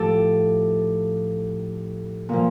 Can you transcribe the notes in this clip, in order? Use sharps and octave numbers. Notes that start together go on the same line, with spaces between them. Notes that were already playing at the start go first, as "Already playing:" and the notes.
Already playing: A2 F3 G4 A4
A#2 F3